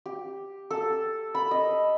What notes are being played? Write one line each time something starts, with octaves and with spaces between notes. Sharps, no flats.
G4
A4
B5
D#5